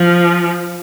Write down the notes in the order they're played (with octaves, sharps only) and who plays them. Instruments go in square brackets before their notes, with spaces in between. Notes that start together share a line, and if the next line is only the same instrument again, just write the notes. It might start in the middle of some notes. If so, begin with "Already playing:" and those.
Already playing: [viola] F3